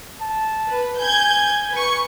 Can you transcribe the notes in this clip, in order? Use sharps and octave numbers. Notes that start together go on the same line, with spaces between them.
A5
B4
G#5 G6 G#6
B4 C#6